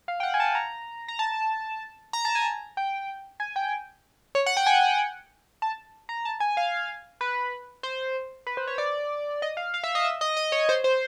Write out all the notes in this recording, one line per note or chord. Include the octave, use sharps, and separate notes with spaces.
F5
G5
F#5
G#5
A5
A#5
A#5
A5
A#5
A5
G#5
G5
G#5
G5
C#5
F#5
G5
G#5
A5
A#5
A5
G#5
F5
B4
C5
B4
C5
C#5
D5
D#5
F5
F5
E5
D#5
E5
D#5
D#5
C#5
C5
C5